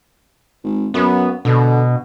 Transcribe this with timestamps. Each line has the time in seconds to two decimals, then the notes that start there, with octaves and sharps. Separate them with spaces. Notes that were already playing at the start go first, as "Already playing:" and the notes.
0.64 G#1
0.94 F#2 B3
1.45 B2 D3